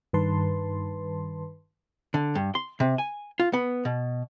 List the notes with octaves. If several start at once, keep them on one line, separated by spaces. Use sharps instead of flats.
G2 D#3 B4 A5 C6
D3
G2
C6
C3
G#5
F4
B3
B2